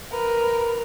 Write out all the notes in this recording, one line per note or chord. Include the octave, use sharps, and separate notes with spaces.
A#4 B4